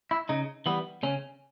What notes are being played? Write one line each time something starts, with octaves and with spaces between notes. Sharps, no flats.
E4
C#3 D#4
E3 G3 B3
C#3 C#4